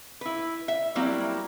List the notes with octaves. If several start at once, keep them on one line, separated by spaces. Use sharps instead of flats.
E4 B4
E5
F#3 G3 A#3 C4 E4